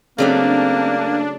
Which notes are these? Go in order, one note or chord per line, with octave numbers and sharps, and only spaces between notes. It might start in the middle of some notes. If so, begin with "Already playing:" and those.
C#3 F#3 A3 A#3 C4 D4